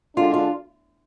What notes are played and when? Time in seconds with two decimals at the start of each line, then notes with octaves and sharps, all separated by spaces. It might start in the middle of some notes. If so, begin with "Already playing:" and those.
0.17 D3 G#3 D4 F4
0.34 F4